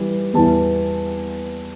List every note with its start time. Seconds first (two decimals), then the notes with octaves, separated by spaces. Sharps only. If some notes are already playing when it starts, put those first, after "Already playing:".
Already playing: E3 G3
0.33 E2 E3 G3 A5